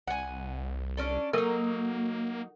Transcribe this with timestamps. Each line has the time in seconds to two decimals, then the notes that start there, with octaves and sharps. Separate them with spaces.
0.07 C2 F#5 G#5
0.97 C#4 D4 A4
1.33 F#3 A#3 D#4 A4 A#4